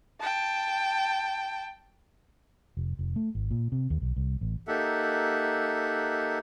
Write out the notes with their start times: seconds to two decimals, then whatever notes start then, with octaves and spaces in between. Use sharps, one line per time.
0.20 G5 A5
2.77 F1
2.99 F1
3.16 A3
3.35 G#1
3.51 A#2
3.72 C3
3.90 D#2
4.02 B1
4.16 C2
4.41 A1
4.67 A#3 D#4 G4 A4 E5 F#5